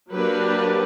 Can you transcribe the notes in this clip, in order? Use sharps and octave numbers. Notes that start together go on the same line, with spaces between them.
F#3 A#3 D4 G4 B4